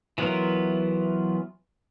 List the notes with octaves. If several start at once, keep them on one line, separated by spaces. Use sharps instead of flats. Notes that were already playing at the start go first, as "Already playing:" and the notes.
E3 F#3 B3 F4 A#4